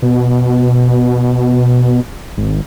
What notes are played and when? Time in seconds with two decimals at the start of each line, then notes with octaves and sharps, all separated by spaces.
0.02 B2
2.37 G#1